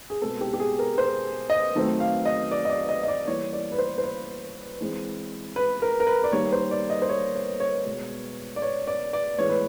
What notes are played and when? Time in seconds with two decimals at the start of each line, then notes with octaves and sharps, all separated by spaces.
0.10 G#4
0.22 B2 G#3 C4 A4
0.41 G4
0.53 G4
0.60 G#4
0.79 A#4
0.98 C5
1.50 D#5
1.75 D#3 F#3 A3 C4
2.00 F5
2.25 D#5
2.51 D5
2.65 D#5
2.70 D5
2.89 D#5
3.03 D#5
3.08 D5
3.27 E3 G3 A#3 C#5
3.53 D5
3.72 B4
3.78 C5
3.98 C5
4.04 B4
4.81 E3 G#3 C4
5.56 B4
5.82 A#4
6.00 A#4
6.07 B4
6.24 D5
6.32 D#3 G3 A#3 C#5
6.52 C5
6.71 D5
6.90 D#5
7.02 C5
7.09 C#5
7.35 C#5
7.60 C#5
7.86 B2 G#3 B3
8.56 D5
8.62 C#5
8.87 D5
9.13 D5
9.38 A2 E3 G#3 B3 C#5
9.50 B4